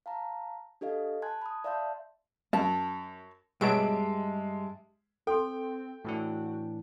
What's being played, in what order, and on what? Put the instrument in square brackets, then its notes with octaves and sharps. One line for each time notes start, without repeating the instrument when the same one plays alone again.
[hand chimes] F5 A5 A#5
D4 G4 A4 D#5 F5
G#5 A5 C6 F#6 G#6
B5 D#6
D5 E5 F5 A5 C6 G6
[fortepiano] F#2 [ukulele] A5
[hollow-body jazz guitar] G2 [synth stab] B2 F#3 D7 [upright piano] G#3 [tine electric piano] G4 E5 A5
[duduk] C4 [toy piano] A4 C6 [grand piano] G5
[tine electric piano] A2 E3 D4 [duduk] F#4